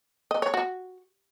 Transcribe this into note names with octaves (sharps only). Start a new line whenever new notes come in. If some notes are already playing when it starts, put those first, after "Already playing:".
D#5
C#5
F#4